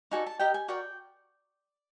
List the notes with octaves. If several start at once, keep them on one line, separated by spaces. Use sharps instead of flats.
D#4 F#4 A4 D5 G#5
A5
G4 A#4 D#5 G5
G#5
F#4 A#4 D5 G5